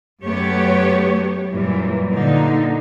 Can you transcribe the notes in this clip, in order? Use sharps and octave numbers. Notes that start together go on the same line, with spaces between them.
F#2 A3 B3 G4 C#5
F#2 A#2 E3 G3
A#2 D3 D#4